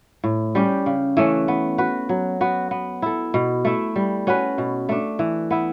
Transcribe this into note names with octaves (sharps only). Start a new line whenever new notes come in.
A2
G3 C#4 G4
C#3
E3 A3 C#4
B3
F#4 B4
F#3
B3 F#4
B3
E4 A4
B2
A3 E4
G3
C#4 F#4 B4
B2
A3 D4
E3
B3 E4